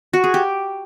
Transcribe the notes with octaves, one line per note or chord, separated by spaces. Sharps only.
F#4
G#4
G4